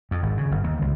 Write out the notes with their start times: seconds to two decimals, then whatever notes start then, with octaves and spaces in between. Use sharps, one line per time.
0.11 F2
0.23 G#1
0.37 C#3
0.51 G1
0.64 D#2
0.82 C#2